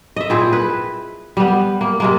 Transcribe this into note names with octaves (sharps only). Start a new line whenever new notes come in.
D#5 E5
A#2 C4 E4 G#4
B4
G3 B3
A#3
C3 G#3 A#3